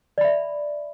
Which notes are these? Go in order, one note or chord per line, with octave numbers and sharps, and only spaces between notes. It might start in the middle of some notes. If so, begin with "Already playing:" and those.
D5 E5 B5